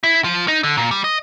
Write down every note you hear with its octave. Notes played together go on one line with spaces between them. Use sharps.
E4
F3
D#4
D3
A#2
G3
D#5